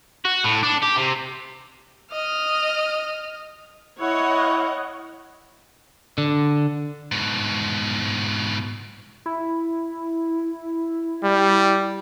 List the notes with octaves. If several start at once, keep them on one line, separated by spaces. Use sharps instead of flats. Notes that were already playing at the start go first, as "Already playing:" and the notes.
F#4
A2
D4
G4
C3
D#5 F6
E4 C#5 D#5 F#5
D3
G#2 B2
E4
G3